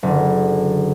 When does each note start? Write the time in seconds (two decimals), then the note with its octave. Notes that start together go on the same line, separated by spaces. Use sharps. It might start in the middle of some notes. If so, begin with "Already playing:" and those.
0.03 F#1 D3